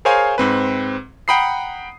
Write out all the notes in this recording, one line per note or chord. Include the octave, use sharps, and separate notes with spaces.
G#4 A#4 C5 C#5 F5 G#5
G#2 C4 B4
F#5 G5 A#5 B5 D#6 C7